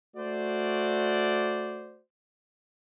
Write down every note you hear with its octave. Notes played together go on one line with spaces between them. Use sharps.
A3 F#4 C5 D5